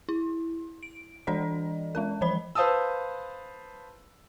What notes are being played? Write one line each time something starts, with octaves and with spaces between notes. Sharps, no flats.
E4
D7
E3 D4 A4 D5 D#5
G#3 C#4 A#4
E3 F3 C5 D#5 B5
B4 C5 F5 A5 D#6 E6